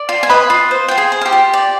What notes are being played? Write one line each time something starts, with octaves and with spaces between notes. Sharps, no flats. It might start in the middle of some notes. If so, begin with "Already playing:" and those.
Already playing: D5
F4
G#5
B4 D#5 B5
F4
C5
F4 G5
G#4 G#5
C5
F5
G4 G5
F4
D5